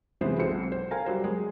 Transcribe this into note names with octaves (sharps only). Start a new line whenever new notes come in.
C3 E3 G#3 B3 C5
B1 C4 F4 C5 C#7
C5
A#4 F5 G5 G#5 A#5
F#3 G3 C5
G#3